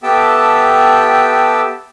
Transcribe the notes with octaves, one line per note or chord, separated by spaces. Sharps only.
B3 G4 A4 E5 G5 A5